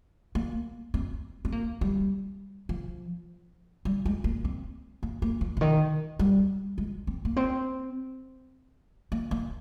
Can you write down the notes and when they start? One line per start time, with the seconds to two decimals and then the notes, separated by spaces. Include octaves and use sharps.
0.35 A#3
0.94 C4
1.45 C4
1.52 A#3
1.81 G3
2.69 F3
3.85 G3
4.06 G#3
4.24 A#3
4.45 C4
5.03 A#3
5.22 A#3
5.41 F3
5.57 C#3
5.61 D#3
6.19 G3
6.78 G#3
7.07 C4
7.25 A#3
7.36 C4
9.12 A#3
9.31 A#3